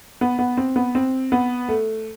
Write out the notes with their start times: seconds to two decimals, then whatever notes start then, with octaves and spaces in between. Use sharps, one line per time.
0.21 B3
0.39 B3
0.57 C4
0.76 B3
0.95 C4
1.32 B3
1.68 A3